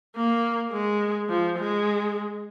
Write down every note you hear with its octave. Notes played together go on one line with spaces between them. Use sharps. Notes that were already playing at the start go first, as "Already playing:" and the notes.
A#3
G#3
F3
G#3